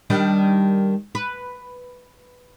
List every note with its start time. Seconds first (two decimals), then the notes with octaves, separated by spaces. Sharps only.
0.10 D#3 G3 D4
1.15 B4